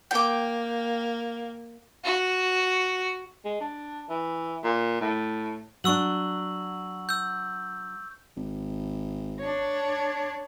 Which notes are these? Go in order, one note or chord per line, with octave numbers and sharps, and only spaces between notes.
A#3 G5 D6
F#4
G#3
D4
E3
A#2
A2
F#3 D4 C#6 E6 F#7
E6 G6
G#1
D4 C#5